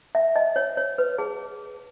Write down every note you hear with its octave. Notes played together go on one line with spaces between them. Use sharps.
E5
D#5
C#5
C#5
B4
G#4